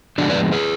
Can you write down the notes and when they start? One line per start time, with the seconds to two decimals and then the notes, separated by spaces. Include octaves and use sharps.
0.18 D3 F3 G#3 B3 D4 F#4
0.30 B4 D5
0.52 G#4 B4